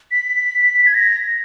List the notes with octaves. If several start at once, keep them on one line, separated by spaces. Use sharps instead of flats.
B6
G#6
A#6